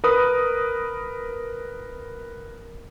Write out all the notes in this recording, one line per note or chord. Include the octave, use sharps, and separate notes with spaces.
A#4 B4 D#6